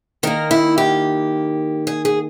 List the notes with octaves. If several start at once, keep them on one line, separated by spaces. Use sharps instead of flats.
D#3 A#3 A#4
E4
G4
G#4
G#4